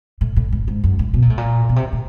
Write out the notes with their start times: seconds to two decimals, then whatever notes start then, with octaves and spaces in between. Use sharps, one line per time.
0.21 A2
0.36 A2
0.52 A2
0.68 G#2
0.84 F#2
0.99 A2
1.14 B2
1.22 A#2
1.30 A2
1.38 A#2
1.69 B2
1.76 C3
1.92 A2